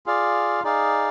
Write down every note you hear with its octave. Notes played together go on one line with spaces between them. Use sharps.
F4 G#4 D5 F5
D#4 G#4 D5 F5